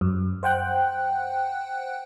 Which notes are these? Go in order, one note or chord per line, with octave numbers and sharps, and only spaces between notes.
F#2
C5 F#5 G5 F#6